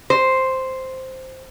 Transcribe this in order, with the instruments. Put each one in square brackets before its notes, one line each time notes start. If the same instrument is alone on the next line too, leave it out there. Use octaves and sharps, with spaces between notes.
[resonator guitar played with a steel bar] C5